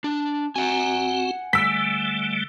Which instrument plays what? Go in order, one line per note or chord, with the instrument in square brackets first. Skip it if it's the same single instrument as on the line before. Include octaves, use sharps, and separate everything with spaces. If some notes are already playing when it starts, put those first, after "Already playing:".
[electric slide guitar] D4
[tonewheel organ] C4 F#4 [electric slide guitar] F#5 G#5
[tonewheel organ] D3 G3 A3 [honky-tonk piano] E6 B6